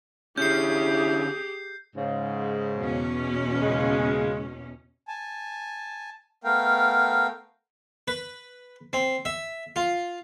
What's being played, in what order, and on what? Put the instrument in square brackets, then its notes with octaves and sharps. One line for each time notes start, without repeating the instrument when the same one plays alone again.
[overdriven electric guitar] D3 C#4 [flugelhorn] E4 [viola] G4 G#4 [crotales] G6 C7
[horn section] G#2 C#3
[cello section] E2 B2 C#4
[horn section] C#3 G#3
[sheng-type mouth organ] G#5 A5
A3 B3 A#4 F5 G5
[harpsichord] B4
C4
E5
F4